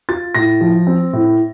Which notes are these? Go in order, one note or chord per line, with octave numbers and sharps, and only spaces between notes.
F4 A6
A2 A#6
F3
C4
A2